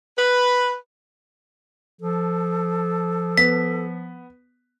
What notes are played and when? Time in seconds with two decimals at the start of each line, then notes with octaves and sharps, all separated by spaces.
0.18 B4
2.00 F3 A4
3.37 B3 B6